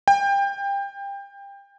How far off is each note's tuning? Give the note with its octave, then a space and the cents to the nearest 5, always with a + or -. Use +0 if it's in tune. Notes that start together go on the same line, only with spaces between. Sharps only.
G5 +25